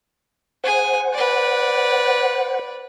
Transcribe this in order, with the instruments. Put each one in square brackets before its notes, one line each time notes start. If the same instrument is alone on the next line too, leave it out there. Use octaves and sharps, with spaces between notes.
[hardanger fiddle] G#4 G#5 [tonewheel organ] C5 F#5
[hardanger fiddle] B4 D5